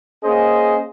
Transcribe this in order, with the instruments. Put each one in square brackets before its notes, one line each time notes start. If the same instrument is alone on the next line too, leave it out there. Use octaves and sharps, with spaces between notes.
[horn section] A#3 C#4 G#4 C5 D#5